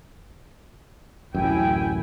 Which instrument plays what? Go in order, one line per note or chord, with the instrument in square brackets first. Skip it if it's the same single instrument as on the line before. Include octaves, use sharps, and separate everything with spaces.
[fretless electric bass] D1 A1 F#2 [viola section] E4 G5 G#5